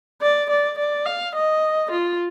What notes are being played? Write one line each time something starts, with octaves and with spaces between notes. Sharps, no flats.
D5
D5
D5
F5
D#5
F4